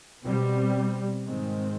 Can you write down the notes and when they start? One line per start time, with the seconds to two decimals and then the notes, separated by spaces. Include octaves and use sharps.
0.23 B2 G3 C4
1.23 G#2 D#3 G#3 C4